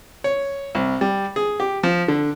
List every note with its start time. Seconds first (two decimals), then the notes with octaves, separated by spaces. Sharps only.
0.24 C#5
0.75 C2
1.01 G3
1.36 G#4
1.60 G4
1.83 F3
2.08 D3